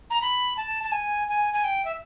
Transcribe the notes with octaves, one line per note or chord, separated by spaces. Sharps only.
A#5
B5
A5
A5
G#5
G#5
G#5
G5
E5